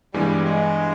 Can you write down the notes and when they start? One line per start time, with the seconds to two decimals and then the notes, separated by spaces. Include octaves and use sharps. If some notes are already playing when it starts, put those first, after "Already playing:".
0.13 G2 E3 G3 G#3 B3
0.45 G#3